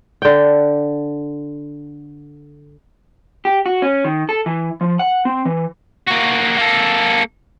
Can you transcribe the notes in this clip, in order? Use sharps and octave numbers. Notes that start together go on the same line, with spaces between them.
D3 G5
G4
F#4
C#4
D#3
A4
E3
F3
F#5
C4
E3
A#3 F#4
A#3 A4